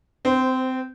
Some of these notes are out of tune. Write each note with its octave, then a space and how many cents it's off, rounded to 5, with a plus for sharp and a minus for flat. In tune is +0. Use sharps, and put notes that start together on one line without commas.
C4 -20 C5 +0